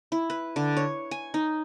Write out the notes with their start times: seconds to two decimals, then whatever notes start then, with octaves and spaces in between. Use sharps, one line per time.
0.12 E4
0.30 B4
0.56 D3
0.77 C#5
1.11 G#5
1.34 D#4